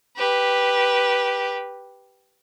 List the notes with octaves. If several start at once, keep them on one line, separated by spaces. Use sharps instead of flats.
G4 B4